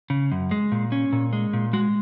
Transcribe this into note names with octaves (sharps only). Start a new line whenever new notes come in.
C#3
F#2
G#3
A#2
C#4
A#2
G#3
A#2
G#3 F#4